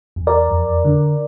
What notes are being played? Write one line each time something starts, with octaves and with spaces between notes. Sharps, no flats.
E2
A#4 D5
F2
D3